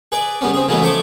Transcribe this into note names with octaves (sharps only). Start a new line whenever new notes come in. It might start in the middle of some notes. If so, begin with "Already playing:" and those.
G#4 B4 D5
C#3 G3 B3 C#4
C4 G#4
C#3 E3 F#3 G#3 A3 B3
F3 A3 C5 C#5 C#6 D6